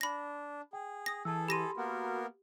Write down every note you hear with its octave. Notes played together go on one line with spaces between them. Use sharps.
D4 B5 A#6
G#4 G5
D#6 A#6
E3 G#4 A4 A5 E6
G4 B5 C6 A#6 D#7
A#3 B3 F#4 A#4